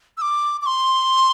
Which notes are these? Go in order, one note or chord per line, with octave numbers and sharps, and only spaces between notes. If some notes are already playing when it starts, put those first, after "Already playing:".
E6
D6
D6
C6